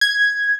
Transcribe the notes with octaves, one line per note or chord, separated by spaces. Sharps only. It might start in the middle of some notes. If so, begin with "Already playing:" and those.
G#6